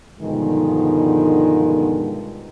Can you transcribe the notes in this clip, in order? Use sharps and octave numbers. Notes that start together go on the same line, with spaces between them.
G2 B2 D3 D#3 F3 G#3